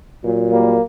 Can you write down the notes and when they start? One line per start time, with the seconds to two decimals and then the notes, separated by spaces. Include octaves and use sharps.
0.23 A#2 F#3
0.51 G3 A#3